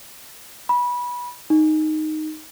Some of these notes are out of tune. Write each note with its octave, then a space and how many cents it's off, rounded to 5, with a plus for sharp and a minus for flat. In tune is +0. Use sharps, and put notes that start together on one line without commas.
B5 -20
D#4 -5